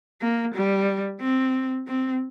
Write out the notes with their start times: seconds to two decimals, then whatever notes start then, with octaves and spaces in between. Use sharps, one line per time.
0.22 A#3
0.55 G3
1.20 C4
1.87 C4